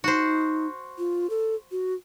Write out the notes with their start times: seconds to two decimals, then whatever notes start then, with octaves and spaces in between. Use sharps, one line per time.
0.04 D#4 F#4 C5
0.98 F4
1.30 A4
1.71 F#4